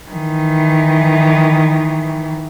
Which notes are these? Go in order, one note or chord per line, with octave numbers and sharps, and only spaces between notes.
D#3 E3